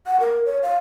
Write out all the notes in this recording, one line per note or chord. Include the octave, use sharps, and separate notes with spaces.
F#5
A#4
C#5
F5